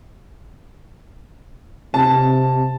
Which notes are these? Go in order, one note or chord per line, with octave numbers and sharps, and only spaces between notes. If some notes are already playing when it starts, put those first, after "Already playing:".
C3 A5